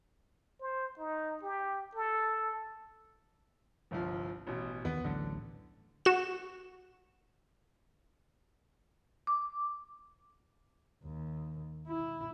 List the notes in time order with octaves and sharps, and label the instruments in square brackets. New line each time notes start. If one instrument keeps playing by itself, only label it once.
[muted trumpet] C5
D#4
G4
A4
[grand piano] G1 C2 F3
A1 B2
[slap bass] D#2 D#3 E3 [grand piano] B3
[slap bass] D1 A1 F#3 [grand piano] D3
[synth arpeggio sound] F#4 E7
[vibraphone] D6
[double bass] D#2
E4